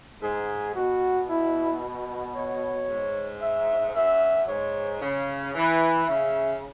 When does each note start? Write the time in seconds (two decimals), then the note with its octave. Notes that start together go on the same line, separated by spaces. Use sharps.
0.22 G#2 G#4
0.75 B2 F#4
1.29 E4
2.36 C#5
2.89 G#2
3.42 E5
3.95 F#2 E5
4.48 G#2 C#5
5.01 C#3 C#5
5.54 E3 E5
6.08 C#3 E5